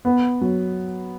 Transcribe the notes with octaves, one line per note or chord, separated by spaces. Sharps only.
B3
F#3